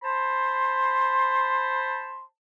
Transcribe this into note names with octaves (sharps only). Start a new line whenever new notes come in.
C5 A5 B5 C6